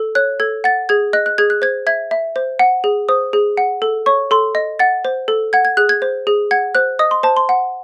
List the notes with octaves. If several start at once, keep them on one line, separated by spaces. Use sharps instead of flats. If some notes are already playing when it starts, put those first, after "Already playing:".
Already playing: A4
C#5 F#6
A4 G#6
F#5 A6
G#4 G#6
D#5 F#6
F#6
G#4 G#6
F#6
C5 G#6
E5 G#6
E5
C5
F#5
G#4
C5 D#6
G#4
F#5
A4
C#5 C#6
A4 C6
D#5
F#5 A6
C5
A4
F#5 G#6
G#6
G#4 F#6
G#6
C5
G#4
F#5 G#6
C5 F#6
D#5 D#6
C6
C5 A5
C6
F#5